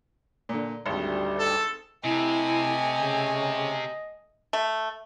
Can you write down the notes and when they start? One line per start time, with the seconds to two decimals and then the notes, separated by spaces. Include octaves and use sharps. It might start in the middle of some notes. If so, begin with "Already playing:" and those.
0.49 A#2 D3
0.86 G#1 D2 G3
1.39 A4
2.04 C3 A3 E4 D#5 G#5
2.98 C#3
4.53 A3